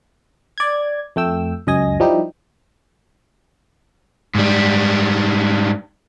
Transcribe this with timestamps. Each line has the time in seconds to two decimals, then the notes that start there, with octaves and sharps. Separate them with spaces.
0.58 D5 G#6
1.16 F2 A3 G5 E6
1.67 C#2 F#2 D#5 G#5 A#6
2.00 F3 G3 D#4 E4 G4
4.35 G#2 G3